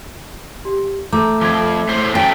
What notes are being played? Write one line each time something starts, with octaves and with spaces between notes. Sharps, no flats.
G4
A3 A#5 D6 G6
F3 C4 D6 G#6
A2 C5
A3 C#4 F#4 G5